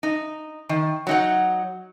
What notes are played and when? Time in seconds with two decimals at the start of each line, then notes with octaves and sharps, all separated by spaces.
0.03 D#4
0.69 D#3
1.07 F#3 D#4 F#5